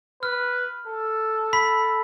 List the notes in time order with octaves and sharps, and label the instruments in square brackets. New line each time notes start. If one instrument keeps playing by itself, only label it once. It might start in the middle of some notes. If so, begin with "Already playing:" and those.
[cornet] B4 [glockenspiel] F6
[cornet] A4
[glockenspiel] B5 B6